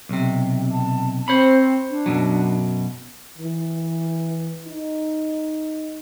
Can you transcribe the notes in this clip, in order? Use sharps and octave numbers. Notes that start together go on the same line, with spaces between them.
B1 C3
A5
C4 C5 C#5 B5
D4
F#2 B2 F#3
E3
D#4